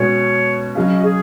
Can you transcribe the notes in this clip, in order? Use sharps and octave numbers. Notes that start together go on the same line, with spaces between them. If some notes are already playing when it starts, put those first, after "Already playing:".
Already playing: B2 G#3 C#4 F#4 C#5
C#3 F#3 C#4 D#5
F#4
G#4